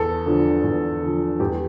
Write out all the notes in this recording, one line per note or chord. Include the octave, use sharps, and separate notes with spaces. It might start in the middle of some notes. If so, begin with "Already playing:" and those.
Already playing: E2 A4
D3 F3
E2
D3 F3
E2 G4